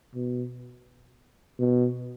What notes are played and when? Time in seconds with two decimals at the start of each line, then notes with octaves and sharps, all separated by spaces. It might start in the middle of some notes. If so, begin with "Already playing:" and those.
0.15 B2
1.59 B2